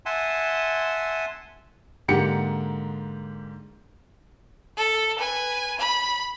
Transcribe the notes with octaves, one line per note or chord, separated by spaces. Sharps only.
E5 F#5 G#5 A5 C6
G#2 D3 A#3 G4 F#5 C#7
A4
B4 G#5
B5